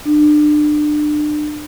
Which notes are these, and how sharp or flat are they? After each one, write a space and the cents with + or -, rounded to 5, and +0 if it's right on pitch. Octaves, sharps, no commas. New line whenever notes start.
D4 +30